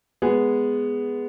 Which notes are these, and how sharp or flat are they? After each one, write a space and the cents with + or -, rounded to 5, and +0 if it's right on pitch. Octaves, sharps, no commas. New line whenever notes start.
G#3 +0 B3 +0 G#4 +0